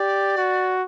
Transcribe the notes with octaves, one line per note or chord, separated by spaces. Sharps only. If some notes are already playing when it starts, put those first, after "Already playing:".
Already playing: G4 D5
F#4